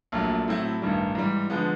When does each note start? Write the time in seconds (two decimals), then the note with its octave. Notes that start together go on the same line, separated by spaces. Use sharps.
0.12 A#1 A#2 F#3 A3
0.48 A2 F#3 A3 C4 E4
0.82 A1 G2 D#3 G3
1.15 G#2 E3 G3
1.50 D3 F3 G#3 B3